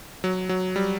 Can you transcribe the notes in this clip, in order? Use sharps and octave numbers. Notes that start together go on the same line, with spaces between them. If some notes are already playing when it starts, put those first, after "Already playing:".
F#3
F#3
G3